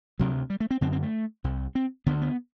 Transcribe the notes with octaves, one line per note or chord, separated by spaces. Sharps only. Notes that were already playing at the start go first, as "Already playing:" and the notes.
D2 C3 F#3
G3
A3
C4
F#2 D3 C4
C4
A3
C2 C3
C4
D2 D3 B3
B3